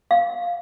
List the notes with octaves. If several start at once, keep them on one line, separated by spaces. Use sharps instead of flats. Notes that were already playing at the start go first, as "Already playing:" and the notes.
F5